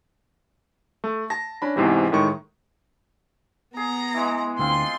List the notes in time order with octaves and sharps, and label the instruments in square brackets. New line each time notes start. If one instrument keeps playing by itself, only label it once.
[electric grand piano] A3
A5 A#6
C#4 D4 B5
E2 G#2 C3 E3
A2 D#3 G#3 C#6
[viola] B3 [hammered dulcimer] G#4 [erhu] A#5
[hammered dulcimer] E3 G#3
[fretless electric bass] D2 [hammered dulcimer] C4 F4 [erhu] C6